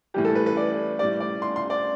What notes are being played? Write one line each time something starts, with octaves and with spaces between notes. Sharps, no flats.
A2 E3 G3 G4
A4
B4
B4
D5
A2 G3 D5
D5
C6
C6
D5